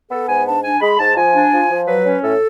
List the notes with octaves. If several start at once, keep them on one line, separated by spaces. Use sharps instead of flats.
B3 A4
G#2 G#5
D4 A5
D4 G#5
G#3 B5
G#2 A5
F3 G#5
D4
F3
F3
F#3 B4
C#4
A2 A4